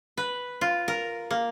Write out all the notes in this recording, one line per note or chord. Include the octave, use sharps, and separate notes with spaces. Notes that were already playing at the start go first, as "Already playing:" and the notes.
B4
F4
A#4
A#3